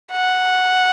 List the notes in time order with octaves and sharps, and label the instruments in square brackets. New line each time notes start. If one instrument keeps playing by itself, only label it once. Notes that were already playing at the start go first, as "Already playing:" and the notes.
[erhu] F#5